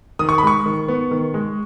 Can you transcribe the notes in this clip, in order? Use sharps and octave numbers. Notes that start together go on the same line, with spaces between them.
D#3 D#6
C#6
B5
G#3 C#6
D#3
B3
D#3
G#3